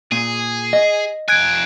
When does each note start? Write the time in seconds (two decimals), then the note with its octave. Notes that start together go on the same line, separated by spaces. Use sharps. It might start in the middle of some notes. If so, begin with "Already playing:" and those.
0.12 A#2 G#4
0.73 D#5
1.29 F2 G#5 F#6 G#6 D7